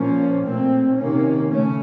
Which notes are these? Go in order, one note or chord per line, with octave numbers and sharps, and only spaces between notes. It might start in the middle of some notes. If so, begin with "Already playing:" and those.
Already playing: A#2 F3 A#3 C#4
A#2 A3 C4
C3 D#3 A#3 C#4
C#3 A3 C#4